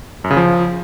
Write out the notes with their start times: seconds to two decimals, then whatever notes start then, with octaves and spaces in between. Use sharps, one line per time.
0.24 F#2
0.31 C#3
0.37 F3